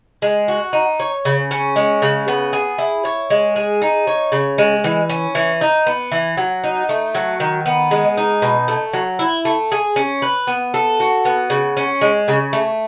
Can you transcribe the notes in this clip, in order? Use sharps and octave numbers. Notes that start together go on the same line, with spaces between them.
G#3
F#4
D#4
C#5
C#3
C#4
G#3
C#3
B3
G#4
E4
C#5
G#3
G#4
D#4
C#5
C#3
G#3
E3
C#4
E3
D#4
B3
E3
F#3
D#4
A3
F#3
D#3
B3
G#3
D#4
B2
A3
F#3
E4
A3
G#4
C#4
B4
B3
A4
F#4
B3
C#3
C#4
G#3
C#3
A3